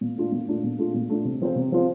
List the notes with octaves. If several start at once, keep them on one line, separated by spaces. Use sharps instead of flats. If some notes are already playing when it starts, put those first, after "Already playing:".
A#2
A3 D4 F4
A#2
A3 D4 F4
A#2
A3 D4 F4
A#2
A3 D4 F4
C3
F3 C4 F4 C5
C3
F3 C4 F4 C5